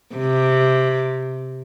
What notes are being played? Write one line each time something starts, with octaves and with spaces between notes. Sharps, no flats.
C3